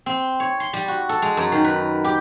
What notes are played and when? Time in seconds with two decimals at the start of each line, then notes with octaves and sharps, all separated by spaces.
0.06 C4
0.40 C#5
0.60 C6
0.73 G3
0.88 F#4
1.09 A4
1.22 G#3
1.37 F#2
1.52 D#3
1.65 B4
2.05 G4